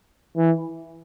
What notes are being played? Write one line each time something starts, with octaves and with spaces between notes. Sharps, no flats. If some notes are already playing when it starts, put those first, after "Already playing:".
E3